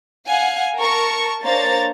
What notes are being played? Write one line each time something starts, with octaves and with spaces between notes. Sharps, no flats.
F5 F#5 G#5
A#4 A5 C#6
A#3 D4 C5 C#5 A#5 A6